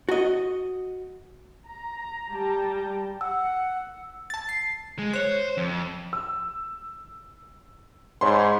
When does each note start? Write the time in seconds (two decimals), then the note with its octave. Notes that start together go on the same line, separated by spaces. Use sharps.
0.09 F#4 D#5
1.67 A#5
2.31 G3 G5 A5 A#5
3.21 F#5 E6
4.30 A5 A6
4.49 C7
4.99 G#3
5.13 C5 C#5 F#6
5.57 F2
6.13 E6
8.21 G#2 C#5 B5 C6